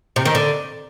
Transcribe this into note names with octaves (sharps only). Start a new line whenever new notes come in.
C3
D#3
D3